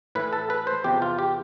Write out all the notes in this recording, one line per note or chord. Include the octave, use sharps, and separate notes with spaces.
A2 E3 B4
A4
B4
C5
E2 C3 F3 G4
F4
G4